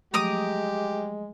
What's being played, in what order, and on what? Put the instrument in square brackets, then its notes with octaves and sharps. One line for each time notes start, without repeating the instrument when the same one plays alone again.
[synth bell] F3 F#3 A3 [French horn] G#3 [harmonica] G4 [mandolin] A#5 D6 D#6